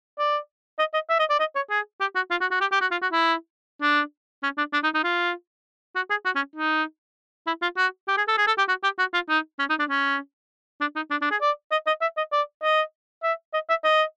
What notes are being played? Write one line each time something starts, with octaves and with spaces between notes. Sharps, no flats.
D5
D#5
D#5
E5
D#5
D5
D#5
C#5
G#4
G4
F#4
F4
F#4
F#4
G4
G4
F#4
F4
F#4
E4
D4
C#4
D4
D4
D#4
D#4
F4
F#4
G#4
F#4
C#4
D#4
E4
F4
F#4
G4
G#4
A4
G#4
A4
G4
F#4
G4
F#4
F4
D#4
C#4
D#4
D4
C#4
D4
D#4
D4
D4
G#4
D5
D#5
D#5
E5
D#5
D5
D#5
E5
D#5
E5
D#5